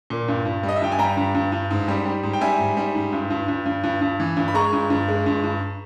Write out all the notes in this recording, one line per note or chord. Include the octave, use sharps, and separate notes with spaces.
A#2
G2
G2
G3
D#5
E5
G2 G5
G#5
G3 G5 A#5
G2
G2
G2
G#2
G3
G3
G#2
G5
G3 E5 G#5
G#2
G3
G#2
G2
G2
G2
G2
G2
G2
E3
G2
B5
G#3 A#5 C#6
G2
G2
G#3
G2
G2